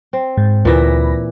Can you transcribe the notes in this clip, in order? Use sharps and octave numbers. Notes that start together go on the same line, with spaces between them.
C4
G#2
D2 A#2 E3 E5 B5 A#6